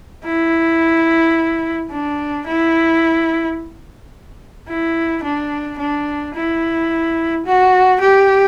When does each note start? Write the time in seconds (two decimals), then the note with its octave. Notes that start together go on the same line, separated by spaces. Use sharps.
0.24 E4
1.91 D4
2.47 E4
4.68 E4
5.23 D4
5.79 D4
6.34 E4
7.46 F#4
8.00 G4